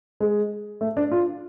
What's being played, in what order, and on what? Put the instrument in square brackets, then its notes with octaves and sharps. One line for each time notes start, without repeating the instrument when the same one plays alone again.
[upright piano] G#3
A3
D4
F4